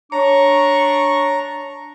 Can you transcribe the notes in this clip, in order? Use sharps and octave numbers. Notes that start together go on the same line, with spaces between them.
D4 C#5 A#5 C#6